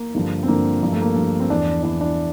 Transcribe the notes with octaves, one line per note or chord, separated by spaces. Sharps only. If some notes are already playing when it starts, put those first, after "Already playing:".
Already playing: A#3
G2 D3 F3
C4
G2 D3 F3 A#3
G2 F3 A#3
A3
A#3
G2 F3
C4
E2 E3 D4
E2 E3 D4
D4